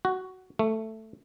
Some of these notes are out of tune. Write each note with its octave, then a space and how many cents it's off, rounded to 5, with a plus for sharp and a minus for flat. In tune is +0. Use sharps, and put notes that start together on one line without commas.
F#4 +10
A3 +5